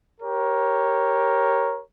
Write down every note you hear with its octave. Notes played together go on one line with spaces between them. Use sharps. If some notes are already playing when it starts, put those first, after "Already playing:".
G4 A#4 C#5